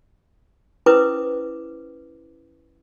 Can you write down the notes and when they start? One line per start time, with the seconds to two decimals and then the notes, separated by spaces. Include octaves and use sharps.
0.86 C#4 E4 B4 C5 D6 D#6